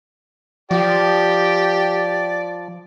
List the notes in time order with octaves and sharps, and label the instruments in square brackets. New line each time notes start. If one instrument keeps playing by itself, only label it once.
[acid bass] F3 [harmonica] G4 [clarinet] D5